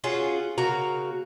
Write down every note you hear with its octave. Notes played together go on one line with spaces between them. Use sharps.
C#4 F4 F#4 G#4
C#3 A#3 F#4 A#5